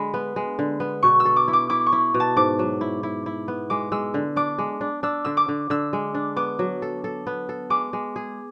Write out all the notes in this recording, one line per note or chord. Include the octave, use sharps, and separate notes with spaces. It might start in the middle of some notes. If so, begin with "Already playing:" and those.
Already playing: D3 G#3 B5
B3
G#3
D3
B3
B2 C#6
E6
A4
D6
E4
D6
E4 D6
C#6
E4
B2
A5
G#2 D6
F#3
E4
E4
E4
B3
G#3 D6
G#3 E6
D3
D4 D6
G#3
D4
D4 E6
D3 E6
D6
D3
D3 E6
G#3
D4
B3 D6
F#3
A4
A4
B3
A4
G#3 D6
G#3
G#4